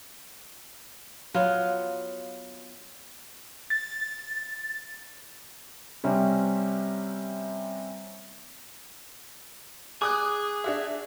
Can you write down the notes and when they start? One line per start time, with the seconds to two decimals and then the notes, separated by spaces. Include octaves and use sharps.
1.34 F#3 B3 F4
3.70 A6
6.04 C3 G3 C4 C#4
10.02 G#4 D6 D#6 F#6
10.64 D4 F#4 E5